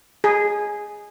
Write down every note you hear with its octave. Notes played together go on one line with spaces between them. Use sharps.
G#4